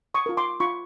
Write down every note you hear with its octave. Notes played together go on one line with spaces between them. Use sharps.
C#6 D#6
F4 A#4
C6 D6
F4 B5 C#6